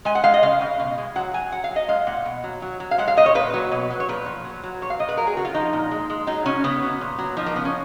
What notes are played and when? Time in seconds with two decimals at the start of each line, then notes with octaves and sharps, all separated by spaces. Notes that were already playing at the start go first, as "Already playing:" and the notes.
0.05 G#3 G#5
0.15 F#5
0.24 G#3 F5
0.34 D#5
0.43 C#3 F5
0.61 C#3
0.80 B2
0.98 G#3
1.16 F#3 F#5
1.33 F#3 G#5
1.52 F#3 F#5
1.64 F5
1.71 F#3
1.76 D#5
1.88 G#3 F5
2.07 A#2 F#5
2.25 B2
2.44 F#3
2.62 F#3
2.80 F#3
2.91 F5
2.98 G#3 F#5
3.08 F5
3.17 A#2 D#5
3.26 C#5
3.34 A#2 B4
3.54 F#3
3.72 B2
3.90 F#3
4.00 C#5
4.09 A#2 B4
4.26 F3
4.44 F#3
4.64 F#3
4.81 A#2 C#5
4.90 F5
4.99 A#2 D#5
5.09 B4
5.17 F#3 A#4
5.27 G#4
5.37 C#3 F#4
5.45 F4
5.54 F3 D#4
5.73 A#2
5.91 G#3
6.10 G#3
6.27 F#3 D#4
6.46 C#3 C#4
6.64 C#3 B3
6.83 F#3
7.01 A#2
7.19 F#3
7.37 F3 D#4
7.46 A#3
7.56 C#3 B3
7.65 C#4